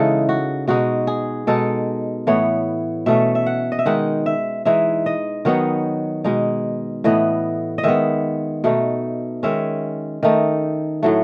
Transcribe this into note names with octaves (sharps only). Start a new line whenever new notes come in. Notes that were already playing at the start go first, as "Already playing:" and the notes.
Already playing: C#3 E3 G#3 D#4 A4
F#4
B2 G#3 D#4 F#4
G#4
B2 G#3 D#4 A4
A2 E3 B3 C#5
B2 A3 C#4 E5
E5
F#5
D#5
E5
D#3 G#3 D#4 F#5
E5
E3 G#3 D#4 E5
D#5
D#3 F#3 B3 D#4 C#5
B2 G#3 D#4
A2 E3 B3 D#5
D#5
D#3 G#3 B3 E5
B2 A3 D#4
D#3 G#3 C#4 E5
D#3 A3 D#4
A2 F#3 A3